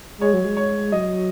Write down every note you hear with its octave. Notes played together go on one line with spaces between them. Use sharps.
G#3 C#5
F#3
G#3
C#5
F#3 D#5